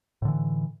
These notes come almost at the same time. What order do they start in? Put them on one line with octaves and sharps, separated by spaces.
A2 D3 E3